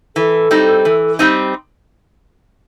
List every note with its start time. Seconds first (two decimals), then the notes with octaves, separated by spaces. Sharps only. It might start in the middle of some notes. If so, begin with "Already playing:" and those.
0.16 E3 A4
0.51 G3 C4 D#4
0.85 E3
1.19 G3 C4 D#4